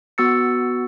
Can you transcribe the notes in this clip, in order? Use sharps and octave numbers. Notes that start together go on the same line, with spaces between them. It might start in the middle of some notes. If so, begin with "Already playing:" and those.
B3 F#4 E6 A6 C#7